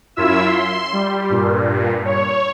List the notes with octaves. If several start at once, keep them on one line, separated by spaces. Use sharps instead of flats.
F#2 E4 F4 E5 E6
C6
G3
G2 A#2
C#5